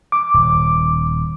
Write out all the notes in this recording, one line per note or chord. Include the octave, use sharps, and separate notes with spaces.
D6
D#1